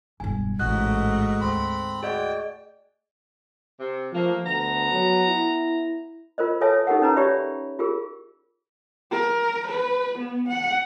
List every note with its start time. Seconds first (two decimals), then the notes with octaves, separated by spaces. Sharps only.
0.20 E1 G2 G#5
0.59 A1 G#2 A3 F#4 D#5 F#6
1.41 D2 C4 B5
2.03 F#4 G#4 D5 D#5 G5
3.79 C3
4.13 F3 A3 A#3
4.45 D2 B3 A#5
4.92 F#3
5.28 E4
6.38 F4 A#4 C5 D#5
6.61 A4 B4 C#5 E5 G#5 A5
6.87 D#4 G4 A4 A#4 F#5
7.02 C#4 D#4 B4 G#5 A#5
7.16 G4 C#5 D5 E5 B5
7.79 F4 G4 G#4 A#4
9.12 A#4
9.67 B4
10.19 B3
10.49 F#5